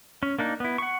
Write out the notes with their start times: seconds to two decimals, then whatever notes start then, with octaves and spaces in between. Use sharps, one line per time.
0.23 C#4
0.39 A#3 D4 D#4
0.60 B3 E4
0.78 F#5 C#6